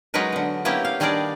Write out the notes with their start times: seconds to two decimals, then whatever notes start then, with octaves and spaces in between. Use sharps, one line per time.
0.14 F#3 G#3 C#4 D#4 A#4 B4
0.33 D3 B3
0.65 A#3 B3 C#4 E4 G4
0.85 F5
1.00 D#3 G3 D4 G#4 A#4 D5